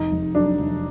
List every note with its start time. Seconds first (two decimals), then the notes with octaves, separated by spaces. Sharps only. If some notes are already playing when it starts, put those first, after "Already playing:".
Already playing: F1 D#4
0.12 F1
0.35 F#3 D4
0.59 F1